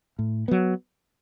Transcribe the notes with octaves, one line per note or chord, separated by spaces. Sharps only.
A2
F#3 B3